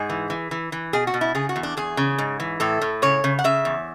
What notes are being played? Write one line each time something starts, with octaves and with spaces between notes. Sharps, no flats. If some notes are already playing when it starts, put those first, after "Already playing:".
Already playing: G#2 G#4
E3
E3
E3
E3
B2 G#4
F#4
B2
E4
C#3 G#4
F#4
E2
D4
E2 G#4
C#3
G#2
E3
A2 A4
A2
C#3 C#5
C#3
F#5
C#3 E5
E2